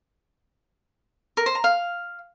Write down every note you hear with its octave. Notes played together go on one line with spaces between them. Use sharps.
A#4
C5
A#5
F5